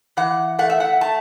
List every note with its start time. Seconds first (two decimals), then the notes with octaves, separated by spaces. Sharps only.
0.17 E3 F#5
0.59 A3 F#5
0.70 E5
0.80 F#5
1.01 A3 A5